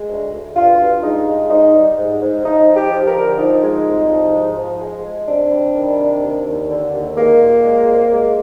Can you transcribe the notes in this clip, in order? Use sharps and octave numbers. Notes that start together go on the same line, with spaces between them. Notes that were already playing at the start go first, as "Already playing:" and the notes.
Already playing: G#3
D2
D2
G2 F4
G2
G#3 D#4
G#3
G#2 D#4
G3
G#2
G#2
F3 D#4
F3
G4
F3
A#4
D3
F3 D#4
G#3
C2
F3
G#2
F3
G#3
G#3
C3 D4
G3
D#3
C3
D#2
D#2
D3
D#2
G#3 A#3
A#2
G#3
C2
G#3